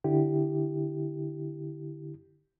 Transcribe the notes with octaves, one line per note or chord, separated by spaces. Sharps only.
D3 E4 G4